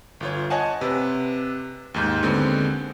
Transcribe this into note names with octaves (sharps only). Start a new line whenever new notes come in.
G1 F4 C#5
C#5 D#5 F#5 G#5 A5
C3 B4
D#2 G#2 G6
D#2 D3 G#3 B3 C4